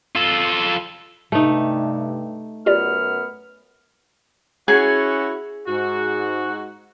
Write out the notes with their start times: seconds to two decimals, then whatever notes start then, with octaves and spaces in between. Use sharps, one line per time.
0.15 F4 A4
1.32 G2 C3 A3 D#4
2.66 F#2 B3 F4 G4 D5 F6
4.68 C#4 E4 F#4 G#4 G#5
5.67 G#2 F#4